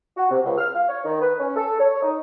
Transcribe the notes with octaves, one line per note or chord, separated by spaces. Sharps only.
F#4
C3
C#2
F6
F5
C#5
D#3
B4
C#4
A4
C#5
D#4